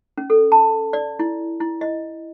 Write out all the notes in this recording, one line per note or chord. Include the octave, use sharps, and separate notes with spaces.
C#4
A4
A5
D5
E4
E4
D#5